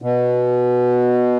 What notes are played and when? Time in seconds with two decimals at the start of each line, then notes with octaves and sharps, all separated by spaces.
0.02 B2